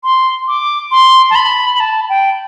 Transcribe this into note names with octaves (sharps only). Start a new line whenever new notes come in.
C6
D6
C6
A5
B5
B5
A5
G5